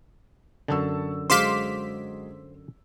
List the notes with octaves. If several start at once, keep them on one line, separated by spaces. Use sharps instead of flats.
F#2 D3 A5 C#6 E6
F#3 G#3 G#4 C5 F5 C6 D6 B6